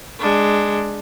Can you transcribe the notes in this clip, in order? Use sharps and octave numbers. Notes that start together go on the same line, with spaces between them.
G#3 D4